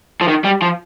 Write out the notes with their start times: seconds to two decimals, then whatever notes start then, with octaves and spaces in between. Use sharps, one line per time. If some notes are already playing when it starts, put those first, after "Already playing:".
0.22 F3
0.29 D#3
0.45 G3
0.62 F3